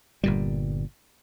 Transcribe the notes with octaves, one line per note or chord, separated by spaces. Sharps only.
G1 A#2 G3